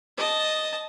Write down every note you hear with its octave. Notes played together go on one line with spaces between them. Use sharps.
D#5 A5